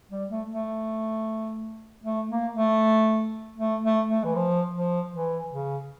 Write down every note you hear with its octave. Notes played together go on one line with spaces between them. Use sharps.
G3
A3
A3
A3
A#3
A3
A3
A3
A3
E3
F3
F3
E3
C#3